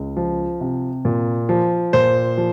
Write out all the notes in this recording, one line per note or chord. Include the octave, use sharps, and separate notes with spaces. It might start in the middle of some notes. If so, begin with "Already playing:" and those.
Already playing: C#2
F3
C3
A#2
F3
A#2 C5
F3